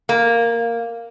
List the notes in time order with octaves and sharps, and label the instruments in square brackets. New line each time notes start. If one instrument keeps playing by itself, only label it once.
[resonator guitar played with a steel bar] A#3